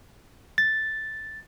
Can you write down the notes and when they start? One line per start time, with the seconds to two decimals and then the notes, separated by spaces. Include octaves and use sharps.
0.58 A6